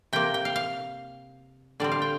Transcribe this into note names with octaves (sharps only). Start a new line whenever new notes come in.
C3 A#3 G5
G5
F5
F5
D3 G3 C4 D5
F5
G5